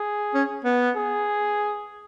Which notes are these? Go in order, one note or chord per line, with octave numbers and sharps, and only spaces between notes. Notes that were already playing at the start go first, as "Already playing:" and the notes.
Already playing: G#4
C#4
B3
G#4